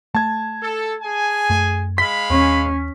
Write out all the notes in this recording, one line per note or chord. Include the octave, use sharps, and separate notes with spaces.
A3 A5 G#6
A4
G#4 G#5
F#2 A3
G#3 F5 B5 B6
D#2 C#4